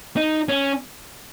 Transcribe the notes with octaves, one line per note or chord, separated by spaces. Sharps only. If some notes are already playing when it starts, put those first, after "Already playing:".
D#4
C#4